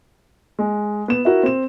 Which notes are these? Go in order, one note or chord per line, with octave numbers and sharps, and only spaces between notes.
G#3
B3 E7
E4 F#4 A#4
C4 E7